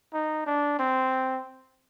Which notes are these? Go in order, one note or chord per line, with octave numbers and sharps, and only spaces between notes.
D#4
D4
C4